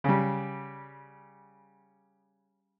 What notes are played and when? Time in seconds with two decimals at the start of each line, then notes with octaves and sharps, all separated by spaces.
0.04 C#3 G3